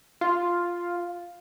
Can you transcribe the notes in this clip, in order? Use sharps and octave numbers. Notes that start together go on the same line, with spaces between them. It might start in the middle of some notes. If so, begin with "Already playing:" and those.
F4